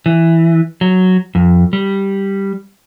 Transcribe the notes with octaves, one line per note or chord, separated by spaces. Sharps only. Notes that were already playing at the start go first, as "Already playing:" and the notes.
E3
F#3
F2
G3